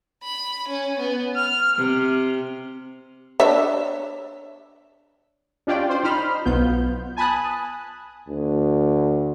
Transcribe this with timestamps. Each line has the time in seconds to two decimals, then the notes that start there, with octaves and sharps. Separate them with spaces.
0.23 B5
0.67 C#4
0.99 B3
1.36 F6
1.78 C3
3.40 D4 C#5 E5
5.67 C#4 D4 F4 G4 D5 G5
5.90 C5
6.04 D#4 C5 B5 F6
6.45 B1 B3 F4 G6
7.17 G#5 A5 B5 D#6 F#6
8.28 D2